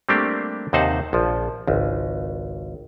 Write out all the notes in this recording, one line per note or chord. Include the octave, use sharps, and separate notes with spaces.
G3 A3 A#3 C4 D4 G4
D#2 C3 D#4 C5 F#5 A5
A#1 F3
G#1 C#2